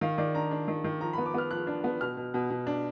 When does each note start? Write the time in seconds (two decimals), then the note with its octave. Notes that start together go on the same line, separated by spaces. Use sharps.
0.01 D#3 F5
0.18 D#3 D5
0.34 D4 A#5
0.51 D4
0.68 D#3
0.84 D#3
1.01 F3 A#5
1.13 B3 B5
1.26 D6
1.34 B3 F6
1.51 F3 F#6
1.67 D4
1.84 B3
2.01 B2 F6
2.17 B2
2.34 B2
2.50 B2
2.67 D4